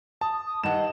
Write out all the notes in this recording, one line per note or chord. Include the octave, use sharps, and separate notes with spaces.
A5 D#6
D#6
G2 D#3 D#5 F#5 E7